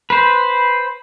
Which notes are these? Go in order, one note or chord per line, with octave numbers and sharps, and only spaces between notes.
B4 C5